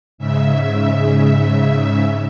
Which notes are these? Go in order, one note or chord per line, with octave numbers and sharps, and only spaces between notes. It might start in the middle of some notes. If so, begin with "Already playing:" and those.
G#2 C#3 E5